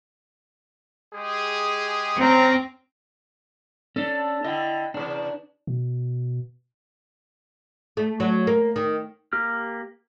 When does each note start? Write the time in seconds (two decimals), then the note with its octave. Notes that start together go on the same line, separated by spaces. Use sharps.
1.13 G#3 G4 G#4
2.20 C4 C#4 A#5
3.96 C#4 D4 A4
4.44 D3 E4 D#5 G5
4.94 E2 C3 D4
5.67 B2
7.97 A3
8.20 F#3
8.47 A#3
8.76 D#3
9.33 A#3 G4 F6